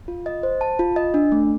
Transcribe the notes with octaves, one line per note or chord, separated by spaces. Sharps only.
F4
D#5
C5
A5
F4
D#5
D4
A3